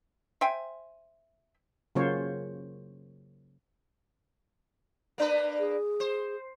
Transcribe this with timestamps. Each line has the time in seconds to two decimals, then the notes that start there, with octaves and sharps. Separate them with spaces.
0.41 C5 E5 G5 G#5
1.95 C#3 F#3 A#3 F4 C5 C#5
5.18 A#3 D4 B4
5.60 G#4
6.00 C5